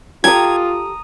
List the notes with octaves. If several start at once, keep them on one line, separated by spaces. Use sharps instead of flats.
F4 G4 A4 A#5 D#6 G#6